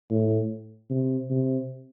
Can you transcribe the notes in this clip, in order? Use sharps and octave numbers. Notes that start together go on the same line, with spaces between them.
A2
C3
C3